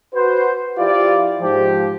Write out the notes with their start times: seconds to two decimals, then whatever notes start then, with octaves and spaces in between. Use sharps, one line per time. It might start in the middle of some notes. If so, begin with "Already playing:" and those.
0.15 F#4 B4 C5
0.78 F3 E4 F4 G4 D5
1.41 G#2 F3 G4